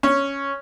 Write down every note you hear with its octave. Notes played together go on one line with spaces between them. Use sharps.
C#4